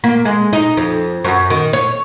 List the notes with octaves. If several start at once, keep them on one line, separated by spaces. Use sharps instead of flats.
A#3
G#3
D#4
F2
F#2
D#3
C#5